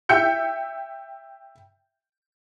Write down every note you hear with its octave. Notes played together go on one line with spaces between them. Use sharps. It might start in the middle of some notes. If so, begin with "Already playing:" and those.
E5 G5 E6 G6 C#7